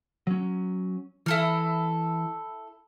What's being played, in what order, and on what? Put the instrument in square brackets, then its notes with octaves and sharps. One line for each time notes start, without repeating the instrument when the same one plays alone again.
[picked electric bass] F#3 C#4
[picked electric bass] E3 [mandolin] E4 A4 F6